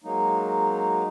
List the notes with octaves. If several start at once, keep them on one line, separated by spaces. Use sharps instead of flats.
F#3 G#3 A#3 D#4